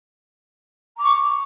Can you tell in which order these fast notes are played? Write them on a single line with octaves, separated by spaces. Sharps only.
A#5 D6 C#6